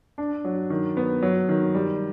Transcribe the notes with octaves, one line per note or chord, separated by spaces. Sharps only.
D4
F#3
D#3
B3
F#3
D#3
G3